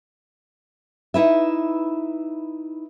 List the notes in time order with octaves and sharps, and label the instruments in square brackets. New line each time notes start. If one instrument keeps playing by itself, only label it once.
[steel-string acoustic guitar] D#4 E4 B4 E5